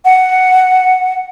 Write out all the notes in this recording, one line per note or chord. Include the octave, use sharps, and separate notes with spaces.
F#5